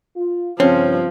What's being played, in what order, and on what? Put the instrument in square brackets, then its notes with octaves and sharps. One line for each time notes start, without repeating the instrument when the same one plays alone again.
[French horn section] F4
[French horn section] G2 C#3 [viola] F3 [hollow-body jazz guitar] C4 [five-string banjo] C#4